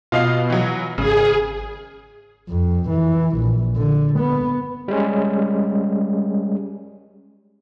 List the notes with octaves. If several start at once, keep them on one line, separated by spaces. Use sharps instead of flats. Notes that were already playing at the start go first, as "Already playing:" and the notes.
B2 F4 D#5 F5
E3 F#3
G#1 C#3 G#4
F2
E3
A#1
D3
B3
G3 G#3 C#4